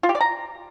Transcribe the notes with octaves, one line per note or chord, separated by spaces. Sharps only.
F4
G4
D5
A#5